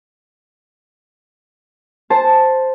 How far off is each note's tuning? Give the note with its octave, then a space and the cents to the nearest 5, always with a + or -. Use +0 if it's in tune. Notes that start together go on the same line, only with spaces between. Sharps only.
C5 +0 A5 +0